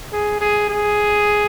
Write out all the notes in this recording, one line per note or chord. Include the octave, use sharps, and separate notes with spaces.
G#4
G#4
G#4